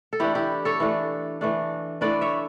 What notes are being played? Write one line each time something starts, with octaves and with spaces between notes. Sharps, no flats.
A4
E3 A3 D4 E4 G4
E4 G4
A4 C#5
E3 A3 D4
E3 A3 D4
E3 A3 D4 B4 D5
C#5 E5